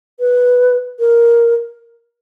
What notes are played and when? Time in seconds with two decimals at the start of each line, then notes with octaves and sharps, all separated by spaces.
0.20 B4
0.99 A#4